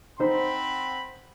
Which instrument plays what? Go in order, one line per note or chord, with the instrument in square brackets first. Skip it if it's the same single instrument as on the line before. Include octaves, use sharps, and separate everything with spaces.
[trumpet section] C4 F#5 B5 [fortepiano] D#4 C5